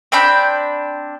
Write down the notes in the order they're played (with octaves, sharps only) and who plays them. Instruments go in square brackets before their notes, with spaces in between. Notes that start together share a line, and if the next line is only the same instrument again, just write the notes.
[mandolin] C4 D4 B5 G6